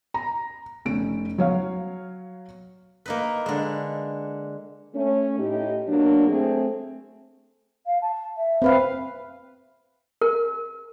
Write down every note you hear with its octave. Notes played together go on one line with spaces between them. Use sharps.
A#5
F1 C#4 D7
F#3 C#5 F5
A#3 D#4 B4
D3 G#3
A3 C#4
A2 D#4 G4
B2 F#3 A#3 D4
A3 C4 G#4
F5
A5
E5
C4 B4 F5
A#4